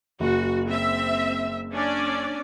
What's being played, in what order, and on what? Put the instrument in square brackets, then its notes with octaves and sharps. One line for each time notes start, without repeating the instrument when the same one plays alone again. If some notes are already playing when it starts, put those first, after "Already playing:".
[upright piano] F#1 [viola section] F#4
[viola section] C4 E5
C#4 D4 D5